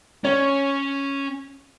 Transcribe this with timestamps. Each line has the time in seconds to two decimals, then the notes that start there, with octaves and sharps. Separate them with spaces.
0.24 C#4 C#5